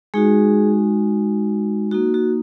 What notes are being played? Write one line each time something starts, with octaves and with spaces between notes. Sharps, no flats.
G#3 D#4 F#4 G#4
A#3 D#4 F#4
F#4